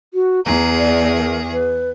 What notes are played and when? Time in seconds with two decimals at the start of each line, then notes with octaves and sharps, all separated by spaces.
0.14 F#4
0.46 E2 G#4 A#5
0.79 D5
1.16 A#4
1.52 B4